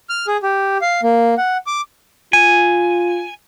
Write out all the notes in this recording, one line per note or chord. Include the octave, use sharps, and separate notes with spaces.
F6
G#4
G4
F5
A#3
F#5
D6
F4 G#5